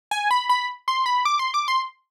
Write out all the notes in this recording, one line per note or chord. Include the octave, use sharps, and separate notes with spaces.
G#5
B5
B5
C6
B5
D6
C6
D6
C6